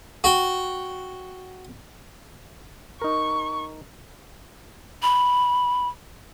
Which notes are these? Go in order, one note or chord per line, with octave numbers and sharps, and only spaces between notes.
F#4 G5
D#4 A#4 C#6
B5